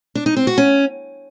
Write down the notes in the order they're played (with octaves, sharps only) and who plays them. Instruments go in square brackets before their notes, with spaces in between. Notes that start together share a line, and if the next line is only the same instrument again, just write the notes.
[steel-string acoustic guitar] D4
D#4
C4
F#4
C#4